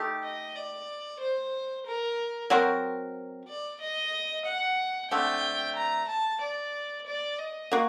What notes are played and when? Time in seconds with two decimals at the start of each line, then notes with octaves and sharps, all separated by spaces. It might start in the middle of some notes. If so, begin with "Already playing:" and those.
Already playing: A3 D#4 G4
0.23 D#5
0.56 D5
1.20 C5
1.86 A#4
2.50 F#3 C4 F#4 A#4
3.48 D5
3.80 D#5
4.45 F#5
5.10 D3 A3 C4 G5
5.76 A#5
6.08 A5
6.41 D5
7.06 D5
7.38 D#5
7.72 A#3 F#4